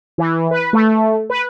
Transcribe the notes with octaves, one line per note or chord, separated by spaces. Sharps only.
E3
B4
A3
B4